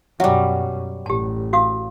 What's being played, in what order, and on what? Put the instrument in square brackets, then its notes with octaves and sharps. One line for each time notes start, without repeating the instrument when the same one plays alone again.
[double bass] F#2 B2 [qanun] F#3 G3 [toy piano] E5
[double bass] A1 [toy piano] G4 A5
[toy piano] F#4 F5 D#6